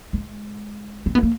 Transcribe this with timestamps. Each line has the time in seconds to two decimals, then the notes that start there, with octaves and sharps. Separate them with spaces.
0.13 G#3
1.06 C4
1.15 B3
1.23 A#3